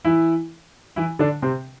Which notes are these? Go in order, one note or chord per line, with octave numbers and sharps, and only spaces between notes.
E3 E4
E3 E4
D3 D4
C3 C4